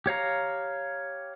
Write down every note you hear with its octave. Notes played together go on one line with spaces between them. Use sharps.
G4 C#5 F5 A#5